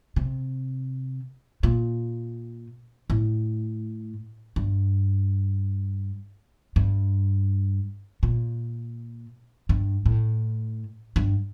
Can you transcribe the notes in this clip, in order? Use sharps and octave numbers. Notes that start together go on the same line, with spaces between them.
C3
A#2
A2
G2
G2
A#2
G2
A2
G2